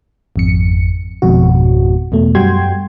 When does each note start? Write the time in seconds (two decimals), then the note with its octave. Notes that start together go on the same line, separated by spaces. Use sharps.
0.36 G#1 F2 C#7
1.22 G#1 F2 G#2 B2 F#4
2.12 E2 B2 A3
2.35 F#2 G3 F#4 G5 C6 G#6